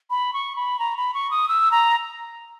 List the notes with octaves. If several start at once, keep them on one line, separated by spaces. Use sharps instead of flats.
B5
C#6
B5
A#5
B5
C#6
D#6
E6
A#5